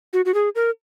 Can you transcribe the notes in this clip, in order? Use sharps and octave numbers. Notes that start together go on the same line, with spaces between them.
F#4
F#4
G#4
A#4